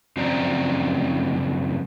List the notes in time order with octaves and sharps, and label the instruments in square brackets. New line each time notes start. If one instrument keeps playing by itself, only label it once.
[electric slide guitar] F#2 C#3 F3 C4 D5 A#5